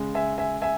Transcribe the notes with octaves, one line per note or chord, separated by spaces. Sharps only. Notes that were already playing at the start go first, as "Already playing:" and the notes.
Already playing: C#3 G#3
E5 G#5
E5 G#5
E5 G#5